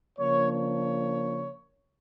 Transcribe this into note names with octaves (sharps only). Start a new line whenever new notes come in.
C#3 F3 A#3 D4 C#5
C#5